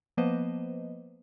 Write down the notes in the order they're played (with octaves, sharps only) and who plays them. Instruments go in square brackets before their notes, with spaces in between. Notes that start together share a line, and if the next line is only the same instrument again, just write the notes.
[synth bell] F3 A#3 B3 B4 C5 D#5